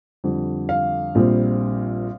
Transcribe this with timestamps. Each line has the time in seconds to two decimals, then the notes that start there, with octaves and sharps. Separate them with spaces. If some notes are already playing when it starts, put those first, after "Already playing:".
0.24 F2 D3 G3
0.69 F5
1.15 A#1 A#2 G3 C4